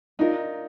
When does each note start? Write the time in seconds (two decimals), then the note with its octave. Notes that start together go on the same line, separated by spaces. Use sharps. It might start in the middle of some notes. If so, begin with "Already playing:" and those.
0.19 D4 D#4 F4 A#4